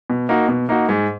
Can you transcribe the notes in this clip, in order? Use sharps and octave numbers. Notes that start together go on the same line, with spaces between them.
B2
A#3 D#4 F#4
B2
A#3 D#4 F#4
G#2